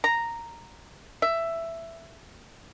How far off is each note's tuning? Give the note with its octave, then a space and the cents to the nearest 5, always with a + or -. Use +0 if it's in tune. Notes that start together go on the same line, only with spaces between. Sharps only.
A#5 -5
E5 +10